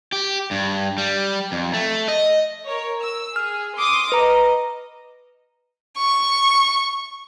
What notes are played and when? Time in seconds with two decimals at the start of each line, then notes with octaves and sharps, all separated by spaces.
0.12 G4
0.51 G2
0.98 G3
1.52 F2
1.73 A3
2.08 D#5
2.67 A#4 C#5
3.02 E6
3.36 G#4 F6
3.78 C6 D6 D#6
4.12 B4 D#5 A#5
5.97 C#6